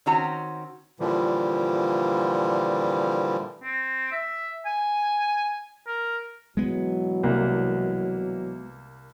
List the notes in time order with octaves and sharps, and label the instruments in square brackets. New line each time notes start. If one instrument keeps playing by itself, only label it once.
[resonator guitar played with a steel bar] D#3 C4 C#4 F#4 A#5
[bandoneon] A#2 D3 E3 F3 G3
[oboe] C4
E5
G#5
A#4
[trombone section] B2 E3 F#3 [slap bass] G#3 B3
[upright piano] C2 A#3